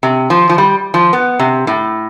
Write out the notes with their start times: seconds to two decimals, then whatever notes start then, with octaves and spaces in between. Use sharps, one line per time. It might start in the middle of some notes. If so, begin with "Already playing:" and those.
0.03 C3
0.30 F3
0.49 F3
0.58 G3
0.94 F3
1.13 B3
1.39 C3
1.67 A2